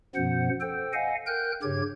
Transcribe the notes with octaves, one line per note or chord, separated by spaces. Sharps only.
F#2 B2 F3 B3 C5 F#5
A4 C5 G5
D#5 F5 F#5 G#5
A#4 G5 F#6 G6
G2 C#3 G4 C#5 G#6